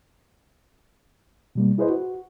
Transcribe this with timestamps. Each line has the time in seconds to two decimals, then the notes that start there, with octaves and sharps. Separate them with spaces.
1.55 B2 G3 A#3
1.78 E4 G#4 B4 C5 D#5
1.90 F#4